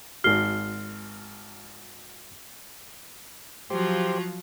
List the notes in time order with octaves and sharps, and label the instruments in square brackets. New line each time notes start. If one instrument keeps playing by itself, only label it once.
[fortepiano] G#1 F#4 [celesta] F6 C7 G7
[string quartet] F3 F#3 F4 [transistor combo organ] G4 C5